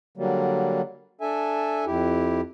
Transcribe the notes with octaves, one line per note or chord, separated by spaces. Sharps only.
D3 F#3 G3 A#3
D4 A4 E5 G#5
F2 E4 G4